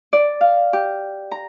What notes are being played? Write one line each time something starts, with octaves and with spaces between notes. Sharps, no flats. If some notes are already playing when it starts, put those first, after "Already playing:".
D5
F5
G4
A#5